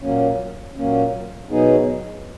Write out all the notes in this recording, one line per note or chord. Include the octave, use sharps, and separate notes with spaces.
A#2 F#3 A#3 C#4
A#2 F#3 A#3 C#4
B2 F#3 B3 D#4 G#4